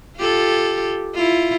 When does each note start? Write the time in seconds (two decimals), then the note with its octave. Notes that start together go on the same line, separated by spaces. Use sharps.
0.17 F4 G4 A4
1.14 E4 F4